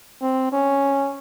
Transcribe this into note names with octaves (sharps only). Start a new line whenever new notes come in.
C4
C#4